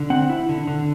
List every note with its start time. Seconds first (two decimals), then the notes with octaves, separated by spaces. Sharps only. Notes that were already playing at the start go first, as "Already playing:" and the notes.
Already playing: D3
0.10 C4 F#5
0.29 E4
0.49 D3
0.67 D3